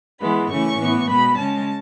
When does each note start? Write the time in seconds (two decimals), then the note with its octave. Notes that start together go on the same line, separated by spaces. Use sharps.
0.21 E3 G#3 B3 B5
0.50 C#3 E3 A3 C#4 C#6
0.79 A2 E3 B3
1.09 B2 G#3 B3 B5
1.38 C#3 G#3 C#4 A5